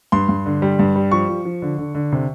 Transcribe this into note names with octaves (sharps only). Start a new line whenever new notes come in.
G2 C6
G2
D3
G3
G2
G3
F3 C#6
F3
F3
D3
D3
D3
C3